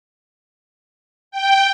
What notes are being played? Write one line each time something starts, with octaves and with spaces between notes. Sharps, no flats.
G5